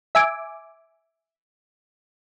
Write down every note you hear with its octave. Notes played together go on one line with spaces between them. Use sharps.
E5 G#5 D6